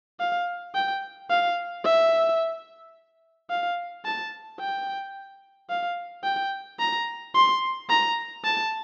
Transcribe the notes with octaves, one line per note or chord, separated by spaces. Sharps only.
F5
G5
F5
E5
F5
A5
G5
F5
G5
A#5
C6
A#5
A5